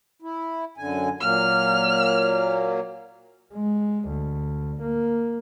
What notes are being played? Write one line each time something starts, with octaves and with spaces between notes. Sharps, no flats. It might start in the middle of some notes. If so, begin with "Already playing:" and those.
E4
F#2 D3 G#5
A#2 F#3 A#3 F6
G#3
D2
A#3